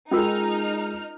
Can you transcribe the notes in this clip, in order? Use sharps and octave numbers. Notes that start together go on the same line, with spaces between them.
G#3 C#4 D#4 F4 G#4 A#4 F6